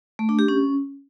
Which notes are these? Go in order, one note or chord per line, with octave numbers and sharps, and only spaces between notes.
A3
D4
G4
C#4